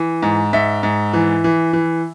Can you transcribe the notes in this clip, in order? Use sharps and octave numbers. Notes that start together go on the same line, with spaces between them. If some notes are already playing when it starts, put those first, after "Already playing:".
Already playing: E3
G#2
G#2 E5
G#2
E3
E3
E3